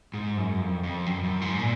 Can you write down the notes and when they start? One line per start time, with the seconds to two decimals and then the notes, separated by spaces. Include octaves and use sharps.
0.14 G#2
0.37 F#2
0.60 F2
0.83 F2
1.06 F#2
1.24 F#2
1.41 G#2
1.59 A#2